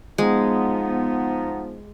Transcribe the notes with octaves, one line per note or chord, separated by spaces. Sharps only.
F3 G#3 B3 D#4